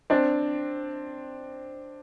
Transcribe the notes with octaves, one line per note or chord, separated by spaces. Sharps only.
C4 D4